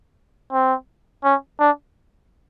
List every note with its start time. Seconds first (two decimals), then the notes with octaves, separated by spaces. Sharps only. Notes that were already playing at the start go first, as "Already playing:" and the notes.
0.52 C4
1.24 C#4
1.60 D4